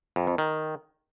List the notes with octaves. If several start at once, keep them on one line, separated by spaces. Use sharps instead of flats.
F2
F2
D#3